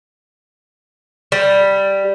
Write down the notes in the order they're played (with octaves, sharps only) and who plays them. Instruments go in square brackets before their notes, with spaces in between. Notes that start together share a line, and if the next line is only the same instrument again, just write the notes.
[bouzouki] G3